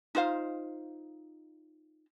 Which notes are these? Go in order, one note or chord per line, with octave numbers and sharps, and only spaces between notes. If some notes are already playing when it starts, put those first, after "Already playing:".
D#4 F4 C5 F5